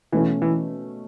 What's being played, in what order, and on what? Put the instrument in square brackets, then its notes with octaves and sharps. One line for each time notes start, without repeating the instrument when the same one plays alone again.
[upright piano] B2 A3 C#4 [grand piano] E3
[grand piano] E3